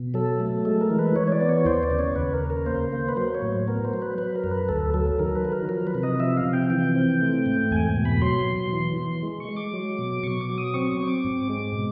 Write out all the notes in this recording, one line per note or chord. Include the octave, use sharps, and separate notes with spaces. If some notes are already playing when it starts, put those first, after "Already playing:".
Already playing: B2
F#3 A4
A3
G#3 A4
A#4
E3
B4
E3 C#5
C#5
D5
B3
C#5
D#2 C5
D5
C#3
C#5
D#2 B4
A#4
C#3
A#4
A#3 C5
A#3
B4
F#3 C5
C#5
A2
B3 A#4
C5
F#3
B4
F#3 B4
A#4
F#2
B4
D2 A4
F#3 A4
D#3 A#4
B4
F#3
A#4
F3 A#4
B4
C3
D#5
F3 E5
F5
C3
G5
E3 G5
C4
A3
G#2
E2 G#5
B2
B5
F#3 C6
B2
E3
E3
G#3
C#6
G#3
D6
F#3
B2
B2 C#6
D6
F#3
D#6
C4 C#6
C#6
C4
D6
G#2
G#3
B2